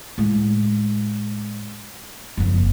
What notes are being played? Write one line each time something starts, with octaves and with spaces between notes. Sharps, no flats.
A2 G#3
F#1 F2